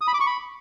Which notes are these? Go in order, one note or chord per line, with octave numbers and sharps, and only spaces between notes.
D#6
B5
D6
C#6
B5